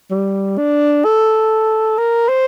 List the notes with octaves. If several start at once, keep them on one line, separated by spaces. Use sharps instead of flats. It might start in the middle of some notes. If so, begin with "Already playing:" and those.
G3
D4
A4
A#4
C5